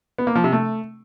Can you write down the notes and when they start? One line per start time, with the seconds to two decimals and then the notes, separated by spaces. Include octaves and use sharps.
0.18 B3
0.27 A#3
0.35 F3
0.44 C3
0.52 A3